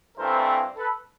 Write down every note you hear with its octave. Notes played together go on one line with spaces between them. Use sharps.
G2 E3 A3 C4 A#4 C5
A4 B4